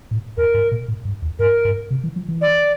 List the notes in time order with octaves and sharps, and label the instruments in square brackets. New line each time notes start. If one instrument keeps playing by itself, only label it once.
[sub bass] A2
[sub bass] F2 [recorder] A#4
[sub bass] G2
A#2
A2
G2
E2
[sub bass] G2 [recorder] A#4
[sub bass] G2
C3
E3
F3
E3
[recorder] D5